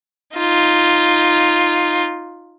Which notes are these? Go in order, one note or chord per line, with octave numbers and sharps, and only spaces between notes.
D#4 F4